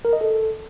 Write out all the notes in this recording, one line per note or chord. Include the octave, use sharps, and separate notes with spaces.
A#4
D#5
A4